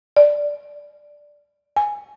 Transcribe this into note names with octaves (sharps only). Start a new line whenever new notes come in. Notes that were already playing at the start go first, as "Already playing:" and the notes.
D5
G#5